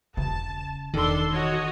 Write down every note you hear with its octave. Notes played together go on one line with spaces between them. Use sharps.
E1 C#3 A5
E1 D#3 D4 A4 C6
F#4 C#5 D#5